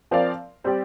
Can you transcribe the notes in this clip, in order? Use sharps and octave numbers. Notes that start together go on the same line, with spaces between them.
F3 C4 A#4 D5 F5
G3 C4 G4 D5